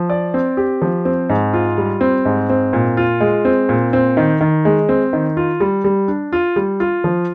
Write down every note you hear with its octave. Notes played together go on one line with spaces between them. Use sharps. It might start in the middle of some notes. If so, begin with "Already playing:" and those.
Already playing: F3
D5
C4
G4
F3
C4
G#2
F4
G3
C4
G#2
C4
A#2
F4
G#3
C4
A#2
C4
D#3
D#3
G#3
C4
D#3
F4
G3
G3
D4
F4
G3
F4
F3